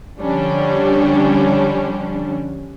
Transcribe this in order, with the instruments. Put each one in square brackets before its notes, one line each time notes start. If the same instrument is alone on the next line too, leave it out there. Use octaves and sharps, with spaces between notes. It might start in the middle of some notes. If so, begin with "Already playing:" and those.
[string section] D3 F3 G3 C#4 D4